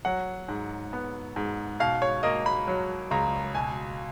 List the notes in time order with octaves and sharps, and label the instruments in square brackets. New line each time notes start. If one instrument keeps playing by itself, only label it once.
[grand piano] F#3 F#5
G#2
B3
G#2
B2 F5
C#5
A#3 D#5
B5
F#3
C#2 A#5
B2 G#5